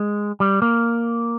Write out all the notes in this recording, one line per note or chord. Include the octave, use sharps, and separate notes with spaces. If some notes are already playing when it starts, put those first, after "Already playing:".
Already playing: G#3
G3
A#3